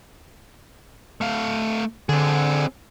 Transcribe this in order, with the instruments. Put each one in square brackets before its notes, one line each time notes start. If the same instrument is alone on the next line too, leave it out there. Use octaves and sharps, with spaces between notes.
[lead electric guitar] A3 F5
[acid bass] D3 [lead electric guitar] C4 G#4